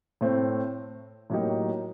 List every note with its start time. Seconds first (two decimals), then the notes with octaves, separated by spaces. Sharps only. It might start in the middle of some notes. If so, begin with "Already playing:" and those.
0.21 A2 A3 C4
1.30 A2 F#3 A#3 D#4 G4